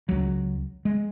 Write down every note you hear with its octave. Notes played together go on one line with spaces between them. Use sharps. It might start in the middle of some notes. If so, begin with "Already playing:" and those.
C#2 F#3
G#3